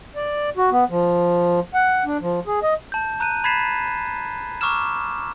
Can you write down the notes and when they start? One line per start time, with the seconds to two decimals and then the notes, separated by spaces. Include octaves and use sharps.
0.16 D5
0.57 F#4
0.72 B3
0.90 F3
1.74 F#5
2.06 D4
2.21 F3
2.47 G#4
2.63 D#5
2.92 A5 G6
3.20 A#5 F#6 G6 D#7
3.44 B5 G#6 A6 B6 C7 E7
4.61 A#5 C#6 D6 E6 F6 E7